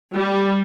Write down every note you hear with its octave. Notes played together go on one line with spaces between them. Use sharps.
G3